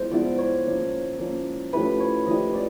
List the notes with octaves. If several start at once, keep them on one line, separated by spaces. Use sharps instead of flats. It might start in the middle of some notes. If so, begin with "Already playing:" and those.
Already playing: F3 G#3 B3 E4 C5
F3 G#3 B3 E4 D5
C#5
F3 A#3 C#4
F3 A#3 C#4
F3 A3 C#4 E4 G4 B4
C#5
F3 A3 C#4 E4 G4 D#5
D5